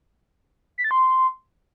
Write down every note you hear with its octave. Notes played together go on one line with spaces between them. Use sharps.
B6
A6
C6